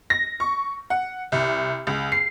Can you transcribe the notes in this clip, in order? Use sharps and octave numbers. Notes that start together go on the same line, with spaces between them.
A#6
C#6
F#5
C2
C#2
C7